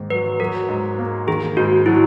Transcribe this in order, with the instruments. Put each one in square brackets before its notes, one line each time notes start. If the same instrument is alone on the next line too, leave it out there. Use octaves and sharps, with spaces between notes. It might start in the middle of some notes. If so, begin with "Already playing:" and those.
Already playing: [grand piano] G#2 D#3 A#3
[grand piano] F#3 [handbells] B4
[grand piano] F#3 [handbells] A#4
[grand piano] G#2
A#3
[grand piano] D#3 [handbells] G#4
[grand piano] G#2 [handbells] F#4
[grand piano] F#3 [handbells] E4